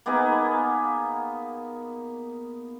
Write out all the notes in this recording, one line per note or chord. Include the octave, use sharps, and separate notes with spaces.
A#3 B3 D#4 G#4